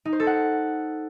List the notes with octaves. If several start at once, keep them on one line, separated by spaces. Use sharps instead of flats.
D#4
C5
A4
F#5